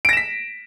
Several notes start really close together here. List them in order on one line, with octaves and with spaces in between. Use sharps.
D7 A#6 E7 B6